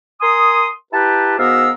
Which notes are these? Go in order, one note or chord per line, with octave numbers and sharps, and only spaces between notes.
A#4 G#5 C6 D#6
E4 G4 B4 G5 A5 A#5
G#2 B3 F#4 A#4 F5 E6